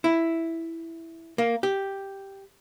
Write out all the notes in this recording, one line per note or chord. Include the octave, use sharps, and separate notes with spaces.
E4
A#3
G4